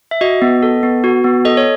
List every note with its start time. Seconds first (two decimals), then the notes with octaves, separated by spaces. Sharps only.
0.11 E5
0.21 F#4 D#5
0.42 B3
0.63 A4
0.83 B3
1.04 F#4
1.24 B3
1.45 A4 D#5
1.57 C#5